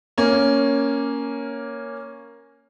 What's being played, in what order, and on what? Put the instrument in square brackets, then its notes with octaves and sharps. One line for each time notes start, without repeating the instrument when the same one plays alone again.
[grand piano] A#3 C#4